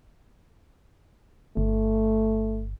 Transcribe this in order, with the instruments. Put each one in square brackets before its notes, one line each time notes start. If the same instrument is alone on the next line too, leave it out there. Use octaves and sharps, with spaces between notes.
[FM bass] G1 [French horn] A3